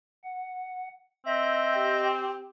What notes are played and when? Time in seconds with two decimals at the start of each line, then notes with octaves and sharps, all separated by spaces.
0.24 F#5
1.27 C4 D#5 E5 G6 A#6
1.75 G4